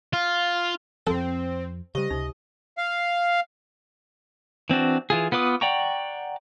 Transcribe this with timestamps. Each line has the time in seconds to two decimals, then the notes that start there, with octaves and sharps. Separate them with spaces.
0.13 F4
1.07 F2 F3 C4 A4 C5
1.95 C#3 G3 G4 C5 D#5
2.10 C#2 C3 D#4
2.78 F5
4.70 E3 C4 D4 F#4
5.10 E3 F4 G#4
5.32 B3 F4 B4 D6 D#6
5.61 D5 F#5 G5 A#5 C#6